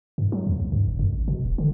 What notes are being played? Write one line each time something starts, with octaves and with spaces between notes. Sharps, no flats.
G2
F#3
E2
C#2
G2
F#1
F#2
G#1
B2
D#1
D3